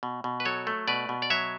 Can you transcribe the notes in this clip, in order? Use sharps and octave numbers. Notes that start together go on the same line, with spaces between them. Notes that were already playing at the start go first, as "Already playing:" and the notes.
B2
B2
B4
F#3 A4 C#5
A3
B2 B4 D5
B2
D5
F#3 C#5 E5